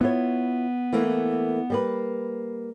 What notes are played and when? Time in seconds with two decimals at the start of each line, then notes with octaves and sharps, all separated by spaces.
0.01 B3 E4 F4 C#5
0.93 E3 A3 A#3
1.70 G3 A#3 B4